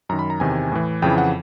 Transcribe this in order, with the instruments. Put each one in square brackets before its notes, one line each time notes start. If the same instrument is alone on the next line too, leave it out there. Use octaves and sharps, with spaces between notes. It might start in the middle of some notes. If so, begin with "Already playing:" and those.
[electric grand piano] F#2 A#5
D#3
B5
A#5
E2 C3 D#3 G#5
A2 E3
F2 C#3 E3 G5
F#5